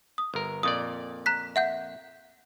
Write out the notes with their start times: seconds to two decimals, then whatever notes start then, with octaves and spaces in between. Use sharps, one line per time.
0.18 D#6
0.34 G1 A#4
0.63 F2 A#2 D5 D#6
1.26 A#5 F#6 B6
1.56 E5 F#5 G6